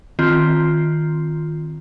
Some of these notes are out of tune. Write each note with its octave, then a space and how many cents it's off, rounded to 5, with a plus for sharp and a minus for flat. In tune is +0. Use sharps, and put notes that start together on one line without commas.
D#3 +0 C4 +0 F4 +0